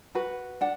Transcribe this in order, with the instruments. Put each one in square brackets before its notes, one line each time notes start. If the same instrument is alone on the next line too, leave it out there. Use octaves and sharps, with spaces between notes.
[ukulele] F#4 B4
D4 F#5